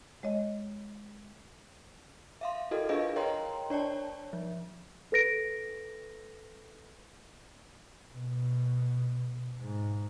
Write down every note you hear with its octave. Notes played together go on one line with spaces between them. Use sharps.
G#3 C#5 D#5
E5 F5 C6
E4 F#4 A4 A#4 D#5
D4 F4 G#4 B4 D#5 F5
A#4 C#5 D#5 G5 A#5 C6
D4 C#5 D5 A5
F3
A4 B4 A#6 D7
B2
G#2